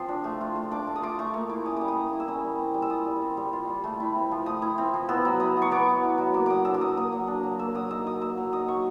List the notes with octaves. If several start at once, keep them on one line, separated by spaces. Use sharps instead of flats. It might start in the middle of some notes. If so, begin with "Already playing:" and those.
Already playing: F3 C4 C6
D4
A3
F4
A3
D4 D6
A3
D#6
F4 D6
A3 C#6
A#3 C#6
E4 D6
C#4 D#6
G3 D6
D#6
A#3
E4
E6
C#4 D#6
G3
C4
G3
E6
F4 D#6
G3
C4
G3
F4
G3
A3
E4
C4
F3
A3 D#6
E4
C4
F3
B3 E6
F#3
E4 D#6
F#3
C#6
B3 D6
F#3
E4
F#3
A#3 D6
F#3 D6 D#6
D4 E6
D6
F#3 D#6
A#3 D#6
F#3
D4
F#3
A#3 E6
F#3 D#6
D#4 E6
F#3 D#6
A#3 E6
F#3
D#4 D#6
F#3 C#6